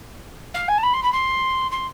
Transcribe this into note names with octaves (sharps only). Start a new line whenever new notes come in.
F5
G#5
A5
B5
C6
B5
C6
C6